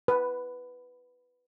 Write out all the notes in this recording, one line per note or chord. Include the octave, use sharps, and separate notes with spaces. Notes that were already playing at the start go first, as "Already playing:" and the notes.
B4